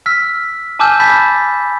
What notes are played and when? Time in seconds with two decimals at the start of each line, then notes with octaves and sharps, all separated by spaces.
0.06 E6 F6 B6
0.79 G#5 A5 D6 E6 F6 G6
1.00 A5 B5 D6 G6 A6 B6